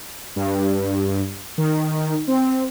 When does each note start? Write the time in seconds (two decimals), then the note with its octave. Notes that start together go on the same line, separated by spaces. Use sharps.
0.36 G2
1.58 D#3
2.28 C4